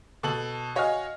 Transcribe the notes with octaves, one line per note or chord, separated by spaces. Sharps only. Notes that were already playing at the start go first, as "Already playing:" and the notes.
B2 A4 F#7
F#4 C#5 D#5 F5 G#5 F6